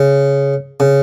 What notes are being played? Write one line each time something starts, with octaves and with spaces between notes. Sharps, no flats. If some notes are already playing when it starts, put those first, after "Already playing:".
Already playing: C#3
C#3